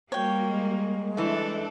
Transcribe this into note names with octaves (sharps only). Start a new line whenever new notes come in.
G3 A#3 F#4 C#5 G5
G#3
E3 A3 D4 A4